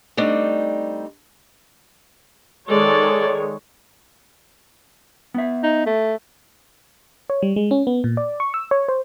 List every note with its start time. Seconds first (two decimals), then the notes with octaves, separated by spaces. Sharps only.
0.17 G3 A3 C4 D4 D#4
2.68 D#3 G#3 A4 C#5 D5
5.34 B3 E5
5.63 D#4
5.86 A3
7.30 C#5
7.43 G3
7.56 G#3
7.71 C#4
7.87 B3
8.04 A#2
8.17 D5
8.40 C#6
8.54 E6
8.71 C#5
8.88 C5